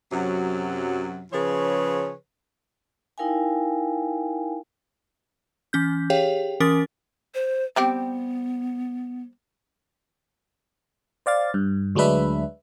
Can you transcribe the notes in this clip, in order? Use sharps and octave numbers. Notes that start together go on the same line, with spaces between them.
F#2 C3 F#3
C#3 F3 G#4 B4 C#5
D#4 E4 A#4 F5 G5 G#5
E3 C#4 G6
G4 G#4 C#5 F5 G5
E3 C#4 A#4 D#6 A6
C5
G3 B3 C4 G4
C5 D5 F5 A6
G2
D2 F#3 G#3 D4 B4 E5